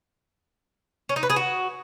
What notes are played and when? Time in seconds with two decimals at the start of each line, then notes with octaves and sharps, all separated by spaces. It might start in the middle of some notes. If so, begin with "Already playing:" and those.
1.09 C#4
1.16 D#4
1.23 B4
1.30 G#4
1.36 F#4